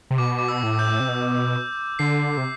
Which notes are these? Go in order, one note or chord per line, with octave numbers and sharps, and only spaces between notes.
C3
B2 D6
D6
E6
A2
G6
C3
B2
D3 C7
C3